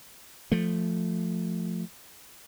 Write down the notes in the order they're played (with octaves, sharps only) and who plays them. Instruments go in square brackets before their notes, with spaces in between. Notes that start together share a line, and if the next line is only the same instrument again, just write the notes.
[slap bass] F3 A3